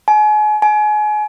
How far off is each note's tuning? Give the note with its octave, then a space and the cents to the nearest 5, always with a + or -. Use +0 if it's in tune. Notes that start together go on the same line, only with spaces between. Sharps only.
G#5 +35
G#5 +30